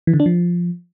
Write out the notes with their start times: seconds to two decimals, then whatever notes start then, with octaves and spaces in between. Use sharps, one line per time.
0.07 E3
0.13 D3
0.20 D4
0.26 F3